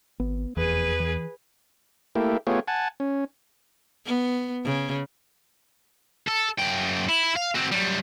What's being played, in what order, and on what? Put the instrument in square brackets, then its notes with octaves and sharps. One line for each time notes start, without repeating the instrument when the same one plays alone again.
[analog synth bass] G#1 [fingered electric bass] B3
[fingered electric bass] F1 E3 [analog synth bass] E2 [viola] G#4 B4
[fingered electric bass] E3
[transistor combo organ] A3 A#3 E4 G4
A3 B3 F4 G4 G#4 C#5
F#5 G#5 A5
C#4
[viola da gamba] B3
C#3
[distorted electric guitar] A4
F#2 G5
E4
F5
C4 F#4
F#2 G3